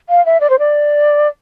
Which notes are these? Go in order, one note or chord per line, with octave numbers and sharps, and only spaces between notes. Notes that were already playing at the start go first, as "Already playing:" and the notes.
F5
E5
D5
C5
D5